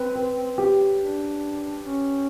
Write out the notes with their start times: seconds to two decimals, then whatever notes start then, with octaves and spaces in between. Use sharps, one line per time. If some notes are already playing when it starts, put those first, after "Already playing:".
Already playing: C4 B4
0.16 B4
0.58 G4
1.00 D4
1.85 C#4